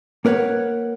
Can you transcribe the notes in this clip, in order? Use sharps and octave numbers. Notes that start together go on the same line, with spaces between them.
A#3 A#4 B4 C#5 F#5